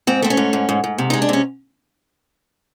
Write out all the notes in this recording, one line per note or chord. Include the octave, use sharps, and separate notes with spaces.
G#2 C4
A3 C4
C#4
G#2
G#2
G#2
G#2
C3
D#4
G#3
D4
C3 C#4